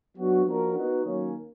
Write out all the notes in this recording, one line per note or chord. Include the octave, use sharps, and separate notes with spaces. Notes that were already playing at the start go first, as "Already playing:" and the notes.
F#3 B3 D4 F#4
F3 A#3 D4 F#4 A#4
B3 D#4 F#4
D#3 F#3 A#3 C#4